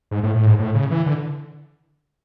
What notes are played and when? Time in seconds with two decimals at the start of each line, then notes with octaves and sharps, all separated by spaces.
0.11 G#2
0.23 A2
0.36 A2
0.46 G#2
0.59 A2
0.75 C#3
0.91 E3
1.06 D3